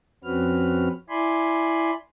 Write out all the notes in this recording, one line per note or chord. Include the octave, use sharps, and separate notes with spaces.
F2 C4 C#4 F#4 B4 F6
E4 D5 G#5 B5 C6